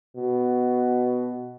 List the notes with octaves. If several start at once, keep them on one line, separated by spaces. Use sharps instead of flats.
B2